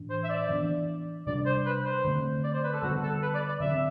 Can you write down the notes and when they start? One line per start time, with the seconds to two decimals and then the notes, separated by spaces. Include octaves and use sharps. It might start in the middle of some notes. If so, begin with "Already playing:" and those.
Already playing: A2 E3 D4
0.10 C5
0.24 E5
0.29 D5
0.49 E3 B3 D4
1.27 C3 G3 D4 D5
1.46 C5
1.65 B4
1.85 C5
2.04 D3 A3 C4
2.44 D5
2.53 C5
2.63 B4
2.73 A4
2.82 D3 G3 B3 F#4
3.02 A4
3.22 B4
3.34 D5
3.48 D5
3.60 D3 F#3 C4 E5